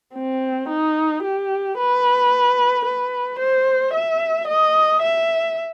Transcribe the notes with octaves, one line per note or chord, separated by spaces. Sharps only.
C4
D#4
G4
B4
B4
C5
E5
D#5
E5